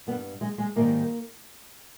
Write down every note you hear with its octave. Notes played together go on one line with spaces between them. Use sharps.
G2 G3 B3
G#3
G#3
G#2 D#3 G3 A#3